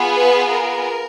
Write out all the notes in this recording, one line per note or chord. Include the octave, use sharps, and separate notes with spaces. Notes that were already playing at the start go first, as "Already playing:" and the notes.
Already playing: B3 F4 G#4
B4
A#4